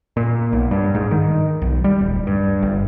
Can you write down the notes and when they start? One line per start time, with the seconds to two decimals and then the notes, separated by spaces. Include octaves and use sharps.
0.17 A#2
0.53 B1
0.71 G2
0.95 G#2
1.11 D#3
1.62 B1
1.84 G3
2.01 D1
2.27 G2
2.62 G1